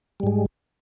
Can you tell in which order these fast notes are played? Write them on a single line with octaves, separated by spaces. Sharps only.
G3 G#2 G#3